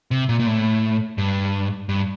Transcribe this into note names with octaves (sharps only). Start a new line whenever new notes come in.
C3
A#2
A#2
A2
G2
G2